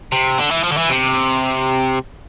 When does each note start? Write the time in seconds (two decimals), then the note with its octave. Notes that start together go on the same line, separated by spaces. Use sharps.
0.12 C3
0.38 D3
0.51 E3
0.64 F3
0.72 D3
0.77 E3
0.89 C3